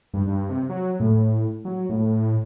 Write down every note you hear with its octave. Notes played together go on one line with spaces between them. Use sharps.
G2
G2
C3
F#3
A2
F#3
A2